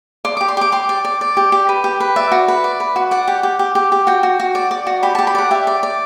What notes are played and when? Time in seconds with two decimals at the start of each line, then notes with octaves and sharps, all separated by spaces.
0.25 D5 C6
0.37 G4 D6
0.48 C6
0.57 G4 D6
0.72 G4 C6
0.89 D5
1.05 D5
1.21 D5
1.37 G4
1.52 G4
1.69 B4
1.84 G4
2.00 B4
2.16 D5 E5
2.32 F#4
2.48 B4
2.64 D5
2.80 B4
2.96 F#4
3.11 D5 F#5
3.28 G4
3.43 G4
3.59 G4
3.75 G4
3.92 G4
4.07 F#4 G5
4.23 F#4
4.40 F#4
4.55 D5
4.71 D5
4.87 F#4
5.03 G4 B5
5.15 G4 A5
5.27 B5
5.35 D5 F#5
5.51 G4 E5
5.67 D5
5.83 D5